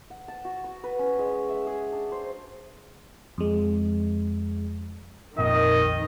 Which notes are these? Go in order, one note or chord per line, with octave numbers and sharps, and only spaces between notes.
F#5
A5
F#4
C#6
B4
C#4
G#3
E5
G#4
D4
C5
F2 G#3
A#1 F2 D#3 D#5